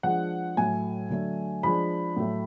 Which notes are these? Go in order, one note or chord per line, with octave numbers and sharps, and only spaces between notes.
F3 G#3 D4 F#5
A2 F#3 A3 G#5
D3 F#3 A3
F3 G#3 D4 B5
A2 F#3 A3